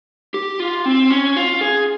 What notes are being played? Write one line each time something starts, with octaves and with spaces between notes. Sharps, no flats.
G4
F4
C4
C#4
F4
G#4